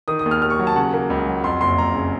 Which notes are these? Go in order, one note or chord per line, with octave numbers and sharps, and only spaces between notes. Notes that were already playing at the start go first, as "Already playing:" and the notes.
D#3 D#6
D#6
D#2
F6
D#2 F6
C#6
F#3
A5
C#3 F#5
A#3
C#2
F#3
F2 C6
F#1 C6
F#1 A#5
C#3